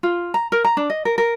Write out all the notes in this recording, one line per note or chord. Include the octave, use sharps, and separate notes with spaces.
F4
A#5
A#4
A#5
D4
D#5
A#4
A#4